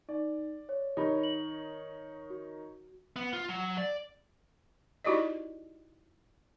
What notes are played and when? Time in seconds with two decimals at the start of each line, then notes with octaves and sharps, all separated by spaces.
0.09 D#4 D5
0.69 C#5
0.97 D#3 D#4 G4 C#5 B5
1.23 F#7
2.30 F#4
3.16 B3
3.33 F4
3.48 F#3
3.78 D5
5.04 D#4 E4 F#4 G4 D5 D#5